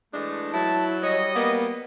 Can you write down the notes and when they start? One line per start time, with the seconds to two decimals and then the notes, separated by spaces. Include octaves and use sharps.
0.13 E3 G#3 A3 D4
0.53 F#3 E4 A5
1.03 G3 C#5 D#5
1.35 A#3 B3